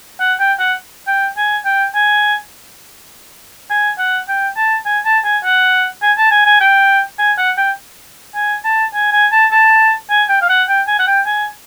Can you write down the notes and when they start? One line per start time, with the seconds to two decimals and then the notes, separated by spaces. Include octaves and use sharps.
0.20 F#5
0.40 G5
0.60 F#5
1.07 G5
1.37 G#5
1.65 G5
1.95 G#5
3.70 G#5
3.99 F#5
4.28 G5
4.56 A5
4.86 G#5
5.05 A5
5.24 G#5
5.44 F#5
6.02 G#5
6.18 A5
6.31 G#5
6.46 G#5
6.61 G5
7.19 G#5
7.38 F#5
7.58 G5
8.35 G#5
8.65 A5
8.94 G#5
9.13 G#5
9.32 A5
9.51 A5
10.10 G#5
10.29 G5
10.42 F5
10.49 F#5
10.69 G5
10.87 G#5
10.99 F#5
11.07 G5
11.26 G#5